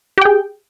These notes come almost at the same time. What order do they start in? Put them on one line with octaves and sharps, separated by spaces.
G4 G5 G#4